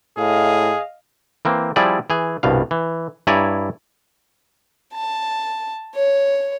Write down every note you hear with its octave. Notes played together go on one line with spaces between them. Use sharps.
A2 G#4 D#5 F5
E3 A#3 C4
F3 G3 C4 E4 G#4 D5
E3 G#4
C2 G2 B2 F5
E3
G2 E4 C#5 D5 G#5 A#5
A5
C#5